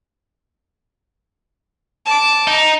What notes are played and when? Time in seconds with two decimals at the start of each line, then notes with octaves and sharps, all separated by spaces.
2.06 A5 D6
2.47 D#4